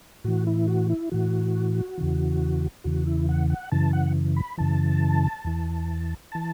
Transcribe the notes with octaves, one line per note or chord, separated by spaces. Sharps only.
A2 E3 F#4
E4
F#4
E4
A2 E3 F#4
E2 C#3 E3
E2 C#3 E3 F#4
E4
F#5
F#5
F#2 C#3 E3 A5
F#5
B5
F#2 C#3 E3 A5
E2 E3
E3 A5